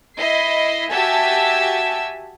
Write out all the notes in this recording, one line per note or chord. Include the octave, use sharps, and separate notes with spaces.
E4 D#5 C7
F#4 G4 E5 G#5 A5 E6